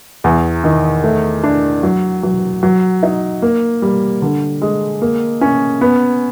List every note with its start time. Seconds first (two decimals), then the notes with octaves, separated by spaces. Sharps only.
0.24 E2
0.64 D#3
1.04 A3
1.44 D4
1.83 F#3
2.23 F#3
2.63 F#3
3.03 D#4
3.42 A#3
3.82 G3
4.22 D3
4.62 G#3
5.02 A#3
5.41 C#4
5.81 B3